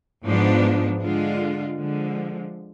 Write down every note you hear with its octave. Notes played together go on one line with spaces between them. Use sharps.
G#2 F3 B3 D4
D3 G#3 D4 F4
D3 F3 G#3